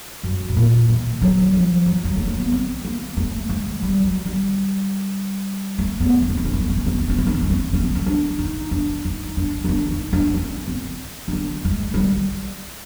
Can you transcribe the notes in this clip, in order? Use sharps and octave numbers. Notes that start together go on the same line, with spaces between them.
F#2
A2
A#2
E3
F#3
F3
F#3
G#3
A3
A#3
B3
C4
A#3
A3
G#3
G3
F#3
G3
A3
B3
C4
C#4
C4
C#4
C4
C#4
C4
C#4
C4
C#4
C4
C#4
C4
C#4
C4
C#4
C4
C#4
C4
C#4
D4
D#4
D4
D#4
D4
D#4
D4
D#4
D4
C#4
C4
D#4
D4
G#3
F#3
G3